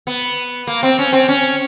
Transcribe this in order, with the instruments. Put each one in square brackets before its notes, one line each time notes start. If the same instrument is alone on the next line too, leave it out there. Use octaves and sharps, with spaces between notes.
[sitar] B3
A#3
C4
C#4
C4
C#4